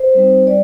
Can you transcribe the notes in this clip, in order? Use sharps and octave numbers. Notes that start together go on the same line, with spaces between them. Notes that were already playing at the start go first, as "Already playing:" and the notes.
Already playing: C5
G3 C4 D#4
G3 D5